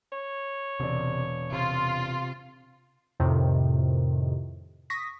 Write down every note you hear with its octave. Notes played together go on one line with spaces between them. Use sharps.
C#5
E1 C3 D5
C3 F4
F2 A2 C3 D#3
C#6 D#6 A#6 B6